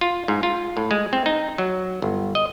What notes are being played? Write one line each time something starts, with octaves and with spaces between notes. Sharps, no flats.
F4
G#2
F4
A2
G#3
C4
D#4
F#3
G1
D#5